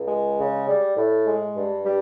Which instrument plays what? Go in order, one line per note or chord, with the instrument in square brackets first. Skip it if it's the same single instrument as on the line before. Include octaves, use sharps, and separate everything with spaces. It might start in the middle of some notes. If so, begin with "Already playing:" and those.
Already playing: [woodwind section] C#2
G#3
C#3
G3
A2
G#3
G2
G3